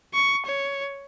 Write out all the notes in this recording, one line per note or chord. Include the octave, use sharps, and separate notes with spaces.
C#6
C#5